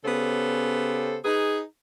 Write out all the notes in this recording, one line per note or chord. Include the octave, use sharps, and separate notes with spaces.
C#3 B3 C#4 G4 A4 C5
D#4 G#4 B4